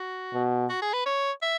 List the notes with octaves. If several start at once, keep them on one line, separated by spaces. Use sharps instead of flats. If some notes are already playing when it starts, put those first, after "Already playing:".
Already playing: F#4
B2
F#4
G#4
B4
C#5
E5